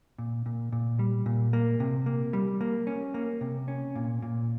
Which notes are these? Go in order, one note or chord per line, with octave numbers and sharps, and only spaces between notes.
A#2
A#2
A#2
G3
A#2
A#3
C3
A#3
G3
A#3
C#4
A#3
C3
C#4
A#2
A#2